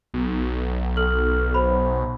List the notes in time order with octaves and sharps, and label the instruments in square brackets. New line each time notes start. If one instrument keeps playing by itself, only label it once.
[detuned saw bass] B1
[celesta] A4 F6 F#7
C5 B5